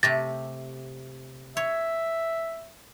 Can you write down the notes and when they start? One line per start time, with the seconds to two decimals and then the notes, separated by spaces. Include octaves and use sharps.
0.03 C3 A3 G4 A6 A#6
1.57 C#5 E5